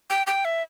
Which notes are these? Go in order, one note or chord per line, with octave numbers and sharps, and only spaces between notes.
G5
G5
E5